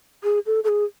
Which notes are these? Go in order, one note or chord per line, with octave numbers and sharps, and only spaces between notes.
G#4
A4
A4
G#4